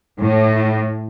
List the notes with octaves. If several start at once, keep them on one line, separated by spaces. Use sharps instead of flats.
A2